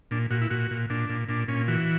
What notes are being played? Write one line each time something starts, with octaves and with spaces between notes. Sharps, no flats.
A#2 D4
A#2 F#4
E4
A#2 F#4
A#2
A#2 D4
A#2
A#2 D4
A#2 C#4
E3 F#4